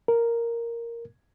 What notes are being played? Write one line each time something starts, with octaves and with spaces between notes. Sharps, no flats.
A#4